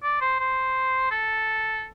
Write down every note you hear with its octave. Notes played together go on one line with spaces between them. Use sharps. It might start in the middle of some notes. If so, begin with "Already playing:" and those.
D5
C5
C5
A4